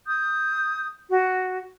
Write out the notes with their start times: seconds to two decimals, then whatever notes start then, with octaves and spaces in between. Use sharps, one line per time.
0.06 D#6 G6
1.10 F#4